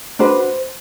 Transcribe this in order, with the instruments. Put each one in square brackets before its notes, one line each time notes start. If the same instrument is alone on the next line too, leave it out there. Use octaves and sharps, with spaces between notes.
[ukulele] D4 F#4 B4 C5